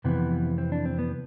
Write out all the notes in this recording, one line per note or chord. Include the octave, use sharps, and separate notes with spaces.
F2 C3 E3 B3
C4
D4
C4
B3